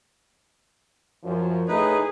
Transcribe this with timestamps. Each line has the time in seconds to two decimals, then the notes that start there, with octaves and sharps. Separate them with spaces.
1.24 F#2 F3
1.68 A2 D#4 G#4 B4